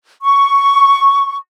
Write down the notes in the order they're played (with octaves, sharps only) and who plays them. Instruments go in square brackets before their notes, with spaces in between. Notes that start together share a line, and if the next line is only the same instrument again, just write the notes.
[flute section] C#6